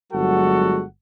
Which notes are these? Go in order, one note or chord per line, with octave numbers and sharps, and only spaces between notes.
G1 F#3 G#3 F#4 A4 F#5